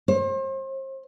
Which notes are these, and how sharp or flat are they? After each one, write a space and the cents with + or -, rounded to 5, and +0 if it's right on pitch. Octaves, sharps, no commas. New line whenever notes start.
C5 +40